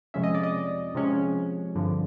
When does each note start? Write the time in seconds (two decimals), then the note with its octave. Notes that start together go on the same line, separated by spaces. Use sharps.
0.14 F2 C3 F3 G#3 C#4 E5
0.24 D#5
0.35 D5
0.43 D#5
0.95 C3 F3 G#3 C#4
1.75 G2 D3 F3